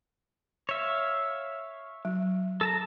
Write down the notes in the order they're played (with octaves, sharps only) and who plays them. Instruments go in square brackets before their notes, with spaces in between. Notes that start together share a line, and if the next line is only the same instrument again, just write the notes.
[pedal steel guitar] C#5 E5 F5
[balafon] F#3
[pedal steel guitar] A4 A5 A#5